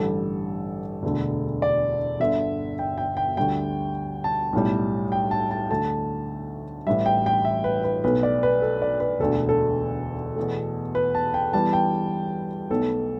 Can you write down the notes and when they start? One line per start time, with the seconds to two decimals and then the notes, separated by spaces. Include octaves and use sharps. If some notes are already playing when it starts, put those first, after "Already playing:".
Already playing: A1 G2 D3 G3 A4
1.03 E1 D2 D3 A3
1.62 D5
2.20 G1 G2 D3 E5
2.79 G5
2.98 G5
3.17 G5
3.37 D2 D3 G3 G5
4.24 A5
4.53 B1 A2 G3
5.12 G5
5.31 A5
5.51 A5
5.71 D2 D3 A3 A5
6.86 A1 A2 E3 G3 E5
7.06 G5
7.26 G5
7.45 E5
7.64 B4
7.84 B4
8.04 B1 B2 A3 B4
8.23 D5
8.43 B4
8.62 A4
8.82 D5
9.00 B4
9.20 E1 D2 D3 A4
9.49 A4
10.36 E2 B2 A3
10.95 B4
11.15 A5
11.34 G5
11.53 E2 E3 G3 A5
11.73 G5
12.70 B1 B2 A3 A4